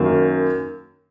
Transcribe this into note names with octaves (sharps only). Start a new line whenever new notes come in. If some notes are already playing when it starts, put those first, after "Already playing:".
Already playing: F#2 D#3 A#3